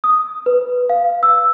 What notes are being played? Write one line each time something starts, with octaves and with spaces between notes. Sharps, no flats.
D#6
B4
F5
E6